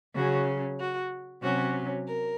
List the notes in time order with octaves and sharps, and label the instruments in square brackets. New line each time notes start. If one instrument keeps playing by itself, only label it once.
[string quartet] C#3 F#3 C#4 F#4
F#4
C3 F#3 C#4 F#4
A#4